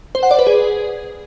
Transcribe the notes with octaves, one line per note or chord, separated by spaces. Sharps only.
C5
F#5
D5
B4
G#4